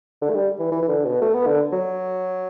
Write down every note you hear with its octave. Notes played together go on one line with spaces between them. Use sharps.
D3
A3
G3
E3
E3
E3
D3
B2
A3
B3
D3
F#3